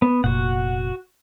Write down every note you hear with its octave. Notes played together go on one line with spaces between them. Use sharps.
B3
F1 A#2 F#4 F#5